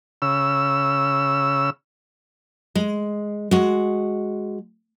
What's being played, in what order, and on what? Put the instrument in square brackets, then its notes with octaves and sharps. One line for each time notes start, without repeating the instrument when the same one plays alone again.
[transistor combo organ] C#3 E6
[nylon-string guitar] G#3
G#3 F#4